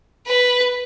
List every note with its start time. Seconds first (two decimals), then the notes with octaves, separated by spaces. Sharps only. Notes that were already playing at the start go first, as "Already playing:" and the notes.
0.27 B4